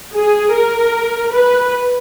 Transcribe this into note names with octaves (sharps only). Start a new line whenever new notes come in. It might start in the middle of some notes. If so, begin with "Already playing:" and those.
G#4
A#4
B4